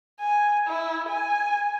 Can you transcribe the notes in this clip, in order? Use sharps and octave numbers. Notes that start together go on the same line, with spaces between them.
G#5
E4
G#5